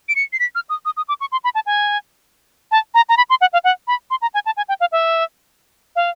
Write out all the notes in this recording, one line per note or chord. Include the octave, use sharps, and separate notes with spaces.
D7
C#7
C7
B6
F6
D#6
D#6
D#6
D6
C#6
C6
B5
A5
G#5
A5
A#5
A#5
B5
C6
F#5
F5
F#5
B5
C6
A#5
G#5
A5
G#5
G5
F5
E5
F5